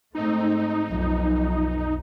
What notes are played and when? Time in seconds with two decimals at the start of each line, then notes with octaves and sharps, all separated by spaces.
0.15 G#2 A3 C4 D#4
0.88 B1 F2